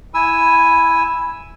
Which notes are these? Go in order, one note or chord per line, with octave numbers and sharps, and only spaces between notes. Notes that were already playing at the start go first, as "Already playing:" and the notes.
E4 G#5 E6